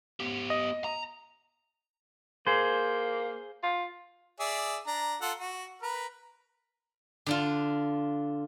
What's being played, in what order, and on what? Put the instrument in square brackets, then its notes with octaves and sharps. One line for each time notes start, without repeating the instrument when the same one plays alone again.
[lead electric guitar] B3 G4
[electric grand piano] D#5
[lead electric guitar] A#5
[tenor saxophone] A#3 [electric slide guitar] G#4 C5
[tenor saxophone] F4
[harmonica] G#4 D5 E5
D4 A#5
F4 A4 F#5
F#4
A#4 B4
[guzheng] D3 D4 F4